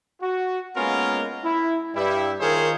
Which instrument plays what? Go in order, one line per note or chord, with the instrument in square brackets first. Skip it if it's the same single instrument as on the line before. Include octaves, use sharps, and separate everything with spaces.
[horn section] F#4
G#3 A#3 B3 C#4 F4 A#4
E4
G2 G3 E4
D#3 F4 G#4 A#4 C5 C#5